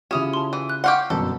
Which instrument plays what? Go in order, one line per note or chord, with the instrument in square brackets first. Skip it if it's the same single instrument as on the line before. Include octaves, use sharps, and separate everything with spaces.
[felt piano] C#3 E4 F4 [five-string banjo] C#4 [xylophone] G4 D#6 F7
[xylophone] A5 C6
[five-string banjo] E3
[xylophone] F#6
[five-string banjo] G4 F5 F#5 [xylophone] C6 C#6
[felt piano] G1 F#2 B2 [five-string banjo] A4